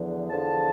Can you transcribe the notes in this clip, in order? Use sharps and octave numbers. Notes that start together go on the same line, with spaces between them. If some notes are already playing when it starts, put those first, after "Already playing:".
Already playing: E2 D3 F3
E2 D3 F3 A5